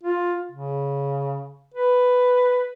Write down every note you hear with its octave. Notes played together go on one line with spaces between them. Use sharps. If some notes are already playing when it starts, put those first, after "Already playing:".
F4
C#3
B4